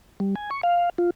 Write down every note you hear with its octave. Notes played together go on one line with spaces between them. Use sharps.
G3
G#5
C#6
F5
F4